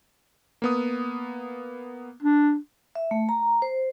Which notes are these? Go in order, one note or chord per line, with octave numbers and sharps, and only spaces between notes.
A#3 B3 D#6
D4
E5
A3
A#5
C5